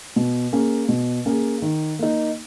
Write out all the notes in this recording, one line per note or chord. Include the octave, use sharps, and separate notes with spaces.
B2
A#3 C#4 G#4
B2
A#3 C#4 G#4
D#3
A#3 D#4